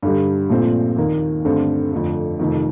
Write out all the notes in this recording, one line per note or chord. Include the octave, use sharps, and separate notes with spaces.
G2 D3 G3
A#1 A#2 F3 A3 C4
D#2 D#3 A#3
G2 D3 A3 C4
F2 D3 A3
F1 F2 D#3